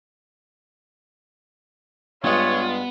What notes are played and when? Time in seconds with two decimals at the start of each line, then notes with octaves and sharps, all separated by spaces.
2.24 G2 G#3 B3 F4 C#5